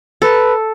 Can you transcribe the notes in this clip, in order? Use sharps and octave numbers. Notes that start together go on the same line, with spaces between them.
A4 B4